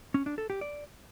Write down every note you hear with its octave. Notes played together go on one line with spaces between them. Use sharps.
C#4
D4
A4
G4
D5